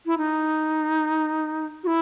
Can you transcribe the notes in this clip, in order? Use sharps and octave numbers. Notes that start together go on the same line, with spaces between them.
E4
D#4
F#4
E4